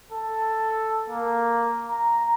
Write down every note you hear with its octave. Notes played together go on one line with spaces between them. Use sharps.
A4
A#3
A#5